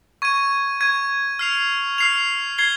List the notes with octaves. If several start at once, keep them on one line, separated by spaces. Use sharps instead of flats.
C#6 G#6 D#7
C#6 G#6 D#7
F6 C7 F7
F6 C7 F7
G#6 C7 G7